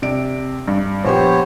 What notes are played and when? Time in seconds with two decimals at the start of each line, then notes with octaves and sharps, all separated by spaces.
0.02 C3 D4 D7
0.68 G2
1.05 A#1 B3 G4 C5 C#5